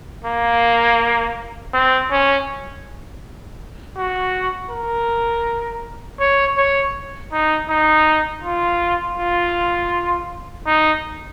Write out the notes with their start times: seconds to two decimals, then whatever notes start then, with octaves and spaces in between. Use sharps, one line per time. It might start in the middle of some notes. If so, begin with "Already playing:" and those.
0.25 A#3
1.73 C4
2.11 C#4
3.97 F#4
4.71 A#4
6.20 C#5
6.57 C#5
7.32 D#4
7.69 D#4
8.43 F4
9.18 F4
10.66 D#4